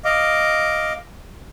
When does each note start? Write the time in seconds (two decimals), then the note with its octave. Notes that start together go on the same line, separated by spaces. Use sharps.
0.05 D#5 F5 D6